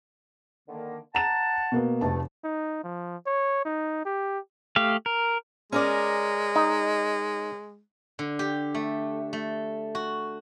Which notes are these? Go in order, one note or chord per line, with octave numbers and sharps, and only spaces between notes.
D3 D#3 A#3
F#5 A5 A#5 E7
B2 A#3 B3
F1 B2 A3 A5
D#4
F3
C#5
D#4
G4
A3 G4 F5
A#4
G#3 C#4 A#4 D5
D#4
D3
G4
A3
A3
F#4